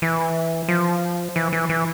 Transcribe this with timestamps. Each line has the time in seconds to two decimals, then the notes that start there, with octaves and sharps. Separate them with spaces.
0.02 E3
0.69 F3
1.36 E3
1.52 E3
1.69 E3